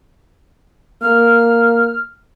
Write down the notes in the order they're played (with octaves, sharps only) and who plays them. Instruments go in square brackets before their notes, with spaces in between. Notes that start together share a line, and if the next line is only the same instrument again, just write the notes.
[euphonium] A#3 [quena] F6